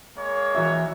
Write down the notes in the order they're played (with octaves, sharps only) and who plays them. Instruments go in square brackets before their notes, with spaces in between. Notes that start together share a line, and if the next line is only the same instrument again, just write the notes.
[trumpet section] G#3 A#3 C#5
[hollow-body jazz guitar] E3 F#4 E5